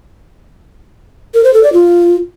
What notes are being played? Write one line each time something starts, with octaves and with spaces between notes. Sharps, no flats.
A#4
C5
A4
D5
F4